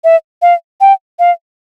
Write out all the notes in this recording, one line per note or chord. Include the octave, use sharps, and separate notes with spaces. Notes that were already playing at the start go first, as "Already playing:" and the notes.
E5
F5
G5
F5